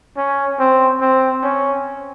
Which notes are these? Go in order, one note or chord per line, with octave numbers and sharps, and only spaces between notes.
C#4
C4
C4
C#4